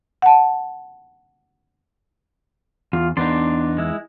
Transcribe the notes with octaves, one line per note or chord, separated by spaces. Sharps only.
F#5 A5
E2 F4
E2 B3 D4 D#4 D5 C6
G#3 E4